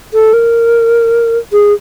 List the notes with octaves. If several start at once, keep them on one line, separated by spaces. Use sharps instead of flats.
A4
A#4
G#4